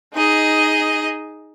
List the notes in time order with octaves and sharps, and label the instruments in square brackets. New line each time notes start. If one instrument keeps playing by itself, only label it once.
[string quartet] D#4 G#4 D#5